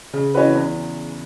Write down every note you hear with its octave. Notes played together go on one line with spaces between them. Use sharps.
C#3
E3 C#4 F#4 B4
E2